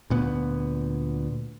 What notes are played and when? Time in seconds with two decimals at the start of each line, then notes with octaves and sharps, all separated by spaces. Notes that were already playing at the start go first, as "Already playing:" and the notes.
0.10 D2 A#2 B3